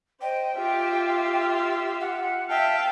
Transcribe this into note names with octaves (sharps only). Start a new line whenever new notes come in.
C5 D#5 G5
F4 G4 E5
F#5
E5 F5 G5 A5